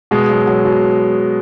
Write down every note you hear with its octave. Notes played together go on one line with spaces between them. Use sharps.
B2 G#3
F#3
F#3
B2